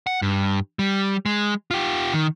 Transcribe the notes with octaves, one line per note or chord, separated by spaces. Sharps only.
F#5
G2
G3
G#3
F4 G4
D#3